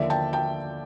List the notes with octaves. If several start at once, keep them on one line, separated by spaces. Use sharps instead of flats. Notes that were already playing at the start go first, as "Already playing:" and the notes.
Already playing: D#2 D3 F3 D5 E5
G5 A5
G5 A5